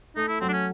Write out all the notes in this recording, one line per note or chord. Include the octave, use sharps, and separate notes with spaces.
A3 D#4
E4
F#3 C4
D4
C#4